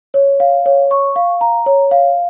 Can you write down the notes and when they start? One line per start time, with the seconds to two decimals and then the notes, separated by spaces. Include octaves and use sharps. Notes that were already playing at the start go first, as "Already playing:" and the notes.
0.14 C#5
0.40 F5
0.66 C#5
0.91 C#6
1.16 F5
1.41 A#5
1.66 C#5
1.91 F5